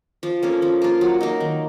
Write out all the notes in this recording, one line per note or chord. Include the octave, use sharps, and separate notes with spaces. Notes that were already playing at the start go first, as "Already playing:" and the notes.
F3
A#3 C#4 A4
F3
A#3 F4
F#3
A#3 D#4
D#3